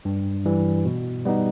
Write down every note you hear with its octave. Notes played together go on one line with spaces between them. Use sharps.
G2
E3 G3
B2
G3 B3 D#4